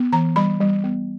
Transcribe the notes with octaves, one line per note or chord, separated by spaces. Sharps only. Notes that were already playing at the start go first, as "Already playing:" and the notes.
Already playing: B3
E3 A#5
G3 B5
G3
B3